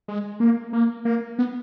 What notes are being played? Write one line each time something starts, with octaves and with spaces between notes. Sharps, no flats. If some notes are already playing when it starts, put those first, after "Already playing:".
G#3
A#3
A#3
A#3
B3